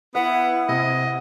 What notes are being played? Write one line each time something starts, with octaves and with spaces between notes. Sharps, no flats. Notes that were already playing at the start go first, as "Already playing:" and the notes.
B3 E4 F#5
C3 D#5